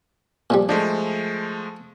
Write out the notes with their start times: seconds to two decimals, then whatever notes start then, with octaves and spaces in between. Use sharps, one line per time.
0.50 A#2 F3 G3
0.69 F3 G#3 A3 D4